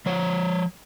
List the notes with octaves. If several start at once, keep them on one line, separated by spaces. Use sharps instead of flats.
F3 C#5